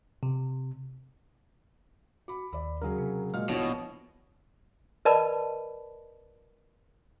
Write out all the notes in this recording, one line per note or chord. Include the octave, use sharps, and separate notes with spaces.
C3
F#4 B5 D6
D#2 D5 B5
C#3 F#3 G#4 A#4
C3
A#2 G#3 A#3 F#4 F5 F6
A#1 B2 E3 F3 C#5
A#4 B4 D5 D#5 A5 B5